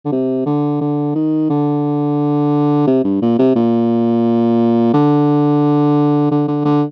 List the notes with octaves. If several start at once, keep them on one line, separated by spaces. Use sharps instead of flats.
D3
C3
D3
D3
D#3
D3
C3
G2
A#2
C3
A#2
D3
D3
D3
D3